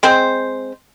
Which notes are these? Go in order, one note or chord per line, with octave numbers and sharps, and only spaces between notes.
G#3 C4 C5